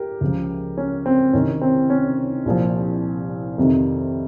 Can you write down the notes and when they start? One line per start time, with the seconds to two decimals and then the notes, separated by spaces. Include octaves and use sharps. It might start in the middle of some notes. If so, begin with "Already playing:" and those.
Already playing: G4 A#4
0.21 C#2 C#3 F3
0.77 C#4
1.06 C4
1.33 C2 C3 D#3 C#4
1.61 C4
1.90 C#4
2.46 C2 A#2 F3
3.58 F2 C3 D#3